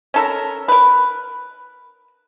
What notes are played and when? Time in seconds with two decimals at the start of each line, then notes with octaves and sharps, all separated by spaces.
0.14 C#4 A4 A#4
0.68 A#4 B4